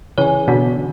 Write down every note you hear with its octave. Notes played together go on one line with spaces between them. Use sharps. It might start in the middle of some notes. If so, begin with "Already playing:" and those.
C#3 E3 C#5 G#5
B2 D3 F#4